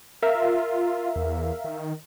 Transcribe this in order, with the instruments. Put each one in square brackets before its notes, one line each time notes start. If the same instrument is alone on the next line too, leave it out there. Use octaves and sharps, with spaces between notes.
[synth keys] A#4 E5 F5
[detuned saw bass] F4
E2
D#3